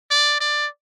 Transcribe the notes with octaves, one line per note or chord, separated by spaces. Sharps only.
D5
D5